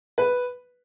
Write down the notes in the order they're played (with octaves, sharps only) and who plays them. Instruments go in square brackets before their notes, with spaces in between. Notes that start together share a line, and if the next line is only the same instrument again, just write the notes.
[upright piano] B4